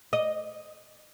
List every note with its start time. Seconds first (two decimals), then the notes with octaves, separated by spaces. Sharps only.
0.13 D#5